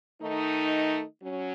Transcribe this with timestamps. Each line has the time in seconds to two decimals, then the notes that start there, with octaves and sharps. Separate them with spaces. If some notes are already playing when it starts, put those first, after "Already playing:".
0.21 D#3 A3 D#4
1.22 F#3 C#4